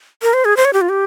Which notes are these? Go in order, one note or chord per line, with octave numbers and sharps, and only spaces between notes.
A#4
C5
G#4
C5
C#5
G4
F4
G4